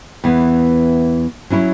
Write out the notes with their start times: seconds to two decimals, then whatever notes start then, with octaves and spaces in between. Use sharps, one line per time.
0.24 E2 E3 B3
1.50 F#3 C#4 E4 C#5